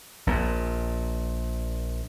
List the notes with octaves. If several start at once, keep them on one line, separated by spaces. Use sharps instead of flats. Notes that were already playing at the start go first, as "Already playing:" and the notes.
A#1 A#2